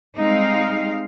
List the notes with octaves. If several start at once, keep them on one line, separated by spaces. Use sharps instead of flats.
G3 G#3 C4 D#4 F5